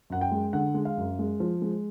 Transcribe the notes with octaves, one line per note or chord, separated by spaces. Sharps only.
F#2 F#5
G5
G#3
D3 F#5
G#3
F5
F#2
G#3
F3
G#3